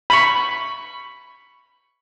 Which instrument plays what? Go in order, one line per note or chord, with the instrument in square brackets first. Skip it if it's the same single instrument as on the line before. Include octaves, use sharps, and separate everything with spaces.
[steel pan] B5 C#6